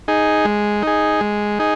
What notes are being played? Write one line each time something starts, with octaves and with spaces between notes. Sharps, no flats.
D#4 G#4
G#3
D#4 G#4
G#3
D#4 G#4